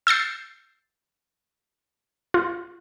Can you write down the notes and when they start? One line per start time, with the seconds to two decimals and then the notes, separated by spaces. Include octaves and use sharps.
0.07 E6 G6 A6 C7
2.34 F4